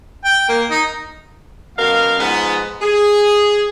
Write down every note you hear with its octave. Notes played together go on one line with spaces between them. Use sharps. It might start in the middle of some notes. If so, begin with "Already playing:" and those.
G5
A#3
D#4
F#2 B2 A#4 F5
G#2 F3 G#3 B3
G#4